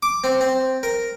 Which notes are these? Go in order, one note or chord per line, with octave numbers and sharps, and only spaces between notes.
D6
C4
C4
A#4